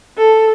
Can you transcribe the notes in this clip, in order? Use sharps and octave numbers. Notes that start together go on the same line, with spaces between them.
A4